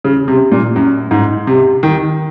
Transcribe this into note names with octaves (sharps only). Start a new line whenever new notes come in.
C#3
C3
A#2
F#2
G#2
C3
D#3